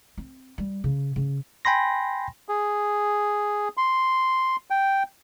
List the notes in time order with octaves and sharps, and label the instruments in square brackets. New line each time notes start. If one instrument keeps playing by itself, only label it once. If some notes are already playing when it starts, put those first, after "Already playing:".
[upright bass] C4
G3
C#3
C#3
[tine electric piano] G5 G#5 B5 C6 A#6
[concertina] G#4
C6
G5